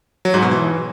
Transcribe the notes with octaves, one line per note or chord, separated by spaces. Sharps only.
F#3
G#2
B2
E3